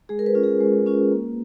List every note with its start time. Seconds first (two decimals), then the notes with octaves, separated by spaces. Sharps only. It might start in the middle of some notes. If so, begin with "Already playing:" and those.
0.09 G#3 G#4
0.19 A#4
0.26 B4
0.35 C#4 F4
0.44 G#4
0.61 G#3
0.86 C#4 F4
1.12 A#3